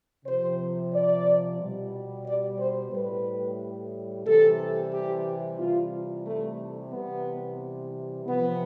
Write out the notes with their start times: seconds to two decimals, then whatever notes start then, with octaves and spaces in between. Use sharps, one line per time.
0.25 C3 F3 C5
0.92 D5
1.59 B2 G3
2.26 D5
2.58 C5
2.92 A2 G3 B4
4.25 C3 E3 G3 A4
4.92 G4
5.59 C3 E3 G3 F4
6.25 A3
6.92 C3 E3 G3 B3
8.25 C3 F3 B3